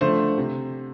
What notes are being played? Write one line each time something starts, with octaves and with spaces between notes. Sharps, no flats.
D3 F3 A3 C5
C3